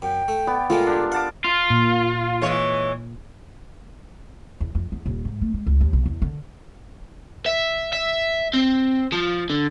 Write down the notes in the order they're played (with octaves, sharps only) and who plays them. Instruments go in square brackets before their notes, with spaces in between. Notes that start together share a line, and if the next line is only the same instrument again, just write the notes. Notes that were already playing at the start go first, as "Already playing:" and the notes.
[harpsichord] F#2 [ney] G5
[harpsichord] A3
[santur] B3 [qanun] D5
[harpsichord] A#2 G#3 A3 [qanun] F4 A4 A#4
[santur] D4 G4
[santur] F5 A5 D6 [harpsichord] F#5
[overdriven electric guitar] F4
[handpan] A#2
[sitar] E3 G#3 C#5
[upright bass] E2
F2
E2
D#1
G#2
A3
G#3
C#2
D#2
B1
E2
D3
[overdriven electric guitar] E5
E5
C4
F3
D3